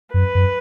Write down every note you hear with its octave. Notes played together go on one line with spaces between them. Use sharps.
F#2 B4
F#2